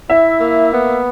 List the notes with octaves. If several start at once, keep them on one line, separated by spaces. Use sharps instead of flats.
E4 E5
A#3
B3